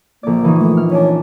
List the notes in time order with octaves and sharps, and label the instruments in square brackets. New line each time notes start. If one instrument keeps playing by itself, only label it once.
[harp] A#1 D5 [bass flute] A#3
[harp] E3 D#4 C#6
[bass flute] A3
[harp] F6
[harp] C#4 D4 [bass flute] C#5